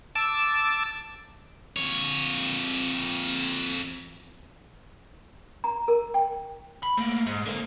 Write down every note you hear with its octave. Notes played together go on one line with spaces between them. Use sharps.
A5 D6 E6
F2 C#5
A#5
A#4
G5
B5
A3 A#3
G#2
D3 A#3